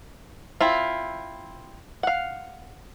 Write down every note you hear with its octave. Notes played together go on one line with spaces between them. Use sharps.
C4 E4 F4
F5 F#5